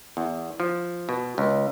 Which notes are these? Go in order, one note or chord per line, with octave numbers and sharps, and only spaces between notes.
E2
F3
B2
C#2